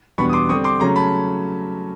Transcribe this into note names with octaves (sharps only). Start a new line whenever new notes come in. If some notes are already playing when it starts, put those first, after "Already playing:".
E2 B2 G3 B3 D4 B5 C#6
D#6
C6 D6
D3 G3 C4 C#6 D#6
C6 D6
C#3 F#3 A3 C#4 A#5 C6
A5 B5